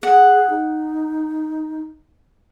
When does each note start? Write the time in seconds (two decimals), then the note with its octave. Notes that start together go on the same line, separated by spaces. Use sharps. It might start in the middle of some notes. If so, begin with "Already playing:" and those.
0.03 G#4 F#5
0.50 D#4